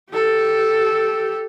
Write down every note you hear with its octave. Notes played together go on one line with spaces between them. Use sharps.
G4 A4